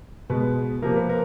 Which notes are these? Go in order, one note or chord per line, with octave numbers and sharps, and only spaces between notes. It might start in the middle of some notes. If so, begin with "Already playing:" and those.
B2 G#3 B3 B4
C3 F3 A#3 A#4
B4
A#4